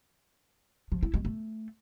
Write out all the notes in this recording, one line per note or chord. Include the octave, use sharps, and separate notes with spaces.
F3
E4
G#3
A3